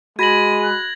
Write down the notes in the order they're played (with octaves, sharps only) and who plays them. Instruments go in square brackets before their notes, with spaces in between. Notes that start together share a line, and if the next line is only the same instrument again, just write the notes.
[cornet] G#3 [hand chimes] F#4 B5 B6 [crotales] G#6 A#6 F#7 [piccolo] D#7
[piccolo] F#6